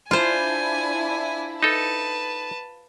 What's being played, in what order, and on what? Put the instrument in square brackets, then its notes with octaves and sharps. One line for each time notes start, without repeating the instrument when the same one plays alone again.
[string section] D4 E4 [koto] F4 C5 [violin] G#5
[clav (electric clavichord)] D#4 A4 [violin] B4 A5